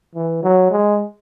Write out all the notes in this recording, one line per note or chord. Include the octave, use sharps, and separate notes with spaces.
E3
F#3
G#3